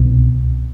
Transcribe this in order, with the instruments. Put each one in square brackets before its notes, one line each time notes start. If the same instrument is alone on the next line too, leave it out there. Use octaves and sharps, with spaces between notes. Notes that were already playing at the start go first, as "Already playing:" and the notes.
Already playing: [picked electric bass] C2 B2